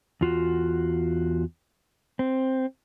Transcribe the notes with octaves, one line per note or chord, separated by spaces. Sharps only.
E2 F4 F#4
C4